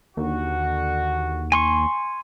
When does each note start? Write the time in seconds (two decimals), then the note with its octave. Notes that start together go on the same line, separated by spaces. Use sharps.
0.17 D#2 D3 F#4
1.52 G#5 C6 C#6